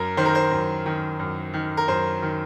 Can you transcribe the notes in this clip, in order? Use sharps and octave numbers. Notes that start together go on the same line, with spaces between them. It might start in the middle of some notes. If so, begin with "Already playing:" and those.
Already playing: F#2 A#4
D#3 C5
A#4
C5
F#2
D#3
F#2
D#3
A#4
F#2 C5
D#3